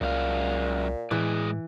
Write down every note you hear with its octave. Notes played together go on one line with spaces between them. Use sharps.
C2 F#2 A#2 G#3 F5
A2 E3 G#3 G#4 D5